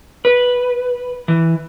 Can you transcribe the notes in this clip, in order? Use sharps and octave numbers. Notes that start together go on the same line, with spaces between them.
B4
E3